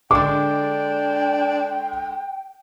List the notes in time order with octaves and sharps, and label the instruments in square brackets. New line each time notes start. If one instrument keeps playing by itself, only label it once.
[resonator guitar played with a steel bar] D3 G#3 [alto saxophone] D4 [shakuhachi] G5 [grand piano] D6